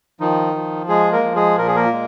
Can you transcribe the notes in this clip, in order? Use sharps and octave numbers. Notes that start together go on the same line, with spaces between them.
D#3 F3 D#4
F3
G#3 G#4
A#3 A#4
F3
G#3 G#4
A#2 A#4
G#4
A#3 A#4
G#3